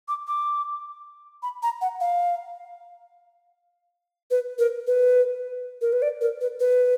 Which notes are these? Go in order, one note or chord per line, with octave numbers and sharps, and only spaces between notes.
D6
D6
B5
A#5
F#5
F5
B4
A#4
B4
A#4
B4
D5
A#4
B4
B4